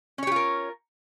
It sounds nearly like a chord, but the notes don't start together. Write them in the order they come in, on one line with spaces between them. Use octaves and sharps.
C#4 C#5 G4 F4 A#4